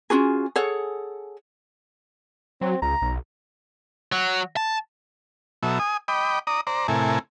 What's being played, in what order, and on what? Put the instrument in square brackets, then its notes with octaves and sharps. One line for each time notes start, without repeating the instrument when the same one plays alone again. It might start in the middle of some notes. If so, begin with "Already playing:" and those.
[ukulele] C#4 F4 F#4 G#4
G#4 A4 C#5 F#5
[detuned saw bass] F#3 [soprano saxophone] C4
[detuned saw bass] C#2 [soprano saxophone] A#5
[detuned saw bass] B1
[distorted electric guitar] F#3
A5
[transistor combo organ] B2 F#3 A4 E5
G#5 D#6
D#5 G5 B5 D6
D5 A#5 D#6
C5 D5 A#5
A2 C3 E4 A4 A#4 G#5